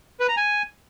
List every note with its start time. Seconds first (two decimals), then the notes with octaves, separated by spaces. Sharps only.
0.20 B4
0.29 A#5
0.37 G#5